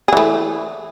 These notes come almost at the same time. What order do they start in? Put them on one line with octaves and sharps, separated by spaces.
G#4 E3 A3